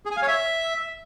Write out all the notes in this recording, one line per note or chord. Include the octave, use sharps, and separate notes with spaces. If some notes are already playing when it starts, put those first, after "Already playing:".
G#4
G#5
F5
C#5
E5